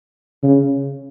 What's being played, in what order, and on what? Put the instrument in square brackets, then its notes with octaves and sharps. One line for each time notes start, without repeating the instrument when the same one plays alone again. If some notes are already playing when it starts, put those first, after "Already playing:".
[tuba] C#3